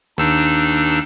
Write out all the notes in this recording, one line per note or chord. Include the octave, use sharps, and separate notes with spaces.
D#2 D4 D#4 E6